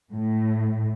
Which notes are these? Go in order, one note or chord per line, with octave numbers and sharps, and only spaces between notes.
A2